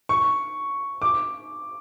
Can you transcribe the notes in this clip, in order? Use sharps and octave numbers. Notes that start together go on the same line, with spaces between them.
C#6
D6